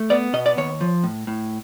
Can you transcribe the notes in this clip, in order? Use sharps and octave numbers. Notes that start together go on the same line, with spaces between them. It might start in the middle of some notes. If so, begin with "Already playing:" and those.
Already playing: A3
B3 D5
B2 D#5
D5
D#2 C#5
F3
A2
A2